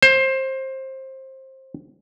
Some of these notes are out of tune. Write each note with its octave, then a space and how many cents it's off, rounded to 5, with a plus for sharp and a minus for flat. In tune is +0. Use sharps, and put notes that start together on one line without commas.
C5 +20